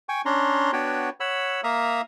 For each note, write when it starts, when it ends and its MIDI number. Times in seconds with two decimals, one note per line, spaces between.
0.09 0.21 79
0.09 0.21 80
0.09 0.21 85
0.26 0.71 61
0.26 0.71 62
0.26 0.71 82
0.26 0.71 84
0.73 1.09 59
0.73 1.09 62
0.73 1.09 66
0.73 1.09 71
0.73 1.09 73
0.73 1.09 79
1.20 1.61 73
1.20 1.61 78
1.20 1.61 83
1.20 1.61 88
1.64 2.01 58
1.64 2.01 76
1.64 2.01 77
1.64 2.01 82
1.64 2.01 87